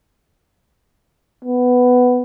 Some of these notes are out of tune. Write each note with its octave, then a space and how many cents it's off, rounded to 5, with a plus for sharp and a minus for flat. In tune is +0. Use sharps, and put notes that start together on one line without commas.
B3 +10